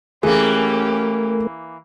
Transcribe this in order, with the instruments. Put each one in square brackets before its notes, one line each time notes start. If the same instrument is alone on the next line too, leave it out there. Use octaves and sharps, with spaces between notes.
[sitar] E3 A#3 [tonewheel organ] A3 A#4 [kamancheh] C#4 G4 [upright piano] G#4